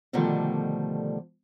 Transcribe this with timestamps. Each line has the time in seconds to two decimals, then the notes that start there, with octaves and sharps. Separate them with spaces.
0.13 B2 D3 D#3 F3 G3 A3